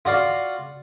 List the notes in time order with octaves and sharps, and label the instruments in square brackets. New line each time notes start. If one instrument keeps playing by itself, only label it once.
[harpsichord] F4 F#4 D5 F5